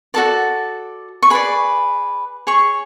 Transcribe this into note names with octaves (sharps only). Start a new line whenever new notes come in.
F#4 A4 D5 A5
C#6
G#4 B4 D5 B5
G#4 C#5 C#6